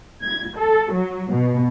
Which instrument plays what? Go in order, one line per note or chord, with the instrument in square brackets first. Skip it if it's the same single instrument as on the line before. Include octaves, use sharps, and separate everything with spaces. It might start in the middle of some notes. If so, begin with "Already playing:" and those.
[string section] G#6
A4
F#3
B2